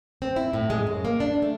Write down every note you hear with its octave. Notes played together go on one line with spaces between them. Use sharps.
C4
E4
A2
G#3
F#2
A#3
D4
A3